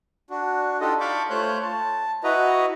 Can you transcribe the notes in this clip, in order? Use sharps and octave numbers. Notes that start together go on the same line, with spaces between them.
D4 F#4
D4 D#4 F4 G4 A4 D#5
F5 A5 B5 C#6 D6 G6
A3 F4 C5 C#5 F#6 G6
A5
E4 F#4 B4 D#5 A#5